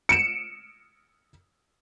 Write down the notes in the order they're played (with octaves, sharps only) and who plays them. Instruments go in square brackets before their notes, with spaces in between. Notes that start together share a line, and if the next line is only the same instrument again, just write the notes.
[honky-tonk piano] C#7 D7 E7